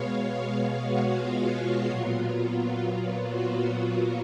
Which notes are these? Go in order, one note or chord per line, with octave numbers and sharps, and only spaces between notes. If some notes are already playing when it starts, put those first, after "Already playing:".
Already playing: B2 G#3 B3 C#5 F5
C#5
F#4
F4
A#2 F#3 B3
F#4